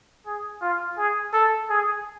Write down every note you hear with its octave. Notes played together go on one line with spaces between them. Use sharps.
G#4
F4
G#4
A4
G#4